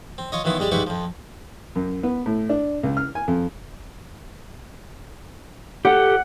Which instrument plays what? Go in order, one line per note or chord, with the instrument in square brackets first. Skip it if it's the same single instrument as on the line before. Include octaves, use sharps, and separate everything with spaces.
[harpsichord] C4
F4 C#5 D#5
D#3 E3 F#3 B3 E4 F4
G3 G#3 G4 D5
G#2 G3 E4 B4 C5 C#6
F2 F3
[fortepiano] F#2
B3
A2
D4
C#2
F6
G#5
F2
[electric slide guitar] G4 A4 [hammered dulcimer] F#5